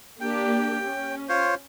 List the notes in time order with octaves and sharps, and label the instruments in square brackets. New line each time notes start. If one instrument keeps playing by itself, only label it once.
[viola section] A#3 D4 G4 [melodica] G5
[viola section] C#4
[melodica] F4 C5 C#5